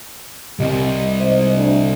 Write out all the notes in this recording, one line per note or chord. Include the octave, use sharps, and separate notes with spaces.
C2 C3 G3 D#5
G#2 C5 D#5
D2